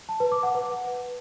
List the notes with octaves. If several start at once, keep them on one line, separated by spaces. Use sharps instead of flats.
A5
B4
D6
F#5
B4